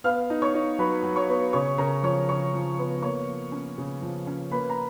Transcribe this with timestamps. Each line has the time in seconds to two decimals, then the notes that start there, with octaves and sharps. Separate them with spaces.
0.04 B3 F5 F6
0.30 D#4
0.42 C#5 C#6
0.54 D#4
0.79 F#3 B4 B5
1.03 F#3
1.16 C#5 C#6
1.29 B3
1.53 C#3 C#5 C#6
1.78 C#3 A#4 A#5
2.03 F3 C#5 C#6
2.29 C#3 C#5 C#6
2.54 F3
2.78 B3
3.02 A#3 C#5 C#6
3.27 F3
3.52 C#4
3.78 C#3
4.02 F3
4.27 C#4
4.52 A#3 B4 B5
4.70 A#5